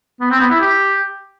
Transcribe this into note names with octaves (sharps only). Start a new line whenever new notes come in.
B3
C4
B3
E4
G4